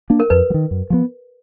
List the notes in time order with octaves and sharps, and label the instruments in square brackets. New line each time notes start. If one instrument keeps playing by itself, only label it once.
[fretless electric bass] A#3 D4
[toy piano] A#4
[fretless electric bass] F2 [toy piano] B4
[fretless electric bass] F#3
D#3
F#2
F3 G#3 B3